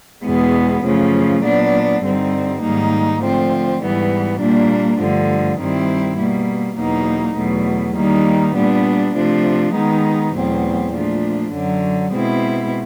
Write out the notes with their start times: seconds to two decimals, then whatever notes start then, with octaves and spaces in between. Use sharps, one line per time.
0.24 E2 B2 G#3 B3
0.84 F#2 C#3 F3 A3
1.43 A#2 F#3 B3 D4
2.02 G2 D3 G3 C4 D#4
2.62 G#2 D#3 G3 A#3 D#4
3.21 D3 F3 A3 C4
3.80 G#2 E3 G3 B3
4.39 A#2 G3 A#3 D4
4.99 G2 D3 F3 A3
5.58 G2 D#3 G3 C4 E4
6.17 B2 G3 A#3
6.77 E2 B2 F#3 A#3 D#4
7.36 E2 B2 F#3 A3
7.96 D#3 G3 A#3 D#4
8.55 A#2 G3 B3 D4
9.15 C3 F3 A3 D4
9.74 D#3 G#3 B3 D#4
10.33 E2 B2 F#3 A3 C4
10.93 A#2 F3 A3 D4
11.52 F#2 D3 F#3
12.12 B2 G#3 C4 E4